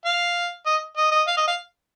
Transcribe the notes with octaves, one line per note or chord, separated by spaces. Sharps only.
F5
D#5
D#5
D#5
F5
D#5
F5